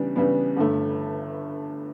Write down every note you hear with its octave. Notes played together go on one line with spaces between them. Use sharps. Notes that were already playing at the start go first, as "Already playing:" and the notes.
Already playing: C#3 E3 G3 B3 D4
C#3 E3 G3 B3 D4
G1 G2 D3 A3